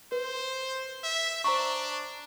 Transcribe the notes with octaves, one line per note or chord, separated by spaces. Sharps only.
B4 C5
E5
D4 C5 A#5 C#6